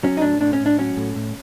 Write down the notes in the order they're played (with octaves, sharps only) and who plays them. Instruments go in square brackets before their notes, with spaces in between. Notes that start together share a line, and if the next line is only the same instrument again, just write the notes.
[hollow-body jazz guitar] F#3 C#4
D#4
A2 D4
A2 D4
C#4
A2
D4
F#3 C#4
A2
A2